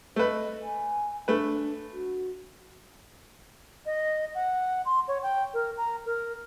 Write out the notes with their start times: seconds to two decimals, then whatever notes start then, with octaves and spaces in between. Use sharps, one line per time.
0.16 A3 B4 D#5
0.62 G#5
1.28 A3 D4 B4
1.92 F#4
3.86 D#5
4.35 F#5
4.85 C6
5.08 C#5
5.23 G5
5.54 A#4
5.77 A#5
6.06 A#4